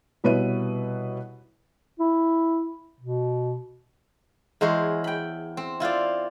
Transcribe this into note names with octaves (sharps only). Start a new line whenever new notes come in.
C2 B2 B4 C#5 E5 D#7
E4
B2
E2 G#3 E4 C5 C#5
G5 B5
C4
E4 F4 C5 D5